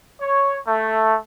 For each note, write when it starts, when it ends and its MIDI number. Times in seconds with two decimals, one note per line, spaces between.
0.20 0.58 73
0.67 1.15 57